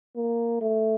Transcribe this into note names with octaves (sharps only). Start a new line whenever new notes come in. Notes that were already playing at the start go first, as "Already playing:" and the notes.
A#3
A3